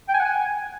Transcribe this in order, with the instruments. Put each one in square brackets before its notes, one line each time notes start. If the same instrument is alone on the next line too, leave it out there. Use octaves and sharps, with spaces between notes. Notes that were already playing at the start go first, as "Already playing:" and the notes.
[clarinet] G5
G#5
F#5
G#5